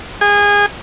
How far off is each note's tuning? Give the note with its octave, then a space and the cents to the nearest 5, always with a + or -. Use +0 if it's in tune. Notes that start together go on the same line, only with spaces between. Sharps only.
G#4 -25